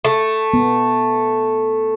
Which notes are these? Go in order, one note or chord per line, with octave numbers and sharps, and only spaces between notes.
A3
B3